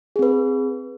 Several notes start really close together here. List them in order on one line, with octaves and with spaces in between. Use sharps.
G#4 C4 B4